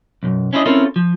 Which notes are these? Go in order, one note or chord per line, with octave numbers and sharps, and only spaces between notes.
B1 F#2
C#4 D4 E4 F4 B4 D#5
C4 C#4 E4 F4 A4 A#4
F3